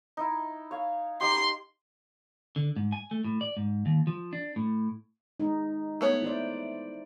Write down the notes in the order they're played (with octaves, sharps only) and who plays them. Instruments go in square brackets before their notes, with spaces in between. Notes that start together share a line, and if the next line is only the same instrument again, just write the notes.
[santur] D#4 E4
C#5 F5
[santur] D#4 G4 [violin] C6
[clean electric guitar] D3
G#2
G#5
A3
A2
D5
G#2
D#2
F3
D4
A2
[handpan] G#3 D#4
[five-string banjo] A3 B3 C#5
[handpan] E4 C5 D5